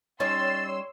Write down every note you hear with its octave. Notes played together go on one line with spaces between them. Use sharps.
G3 C#4 D#4 C#5 C6 E6 A6